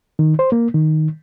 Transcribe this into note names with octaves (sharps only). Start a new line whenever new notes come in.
D#3
C5
A#3
D#3